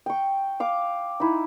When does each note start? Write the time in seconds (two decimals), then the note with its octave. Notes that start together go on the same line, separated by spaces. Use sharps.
0.06 G5 C#6
0.60 F5 D6
1.20 D#4 E4